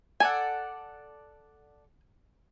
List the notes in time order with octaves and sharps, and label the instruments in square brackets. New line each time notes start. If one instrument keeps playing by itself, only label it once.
[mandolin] A4 D5 F#5 [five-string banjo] G#5